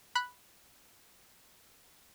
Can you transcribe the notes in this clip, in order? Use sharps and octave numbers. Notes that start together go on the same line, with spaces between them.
B5 F#6